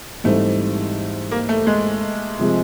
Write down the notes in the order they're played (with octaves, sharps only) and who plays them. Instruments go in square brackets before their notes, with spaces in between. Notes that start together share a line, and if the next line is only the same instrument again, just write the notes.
[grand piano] G#2 E3 G3 C4 D#4 [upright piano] A3
[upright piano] A#3
A3
G#3
[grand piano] C3 F3 G#3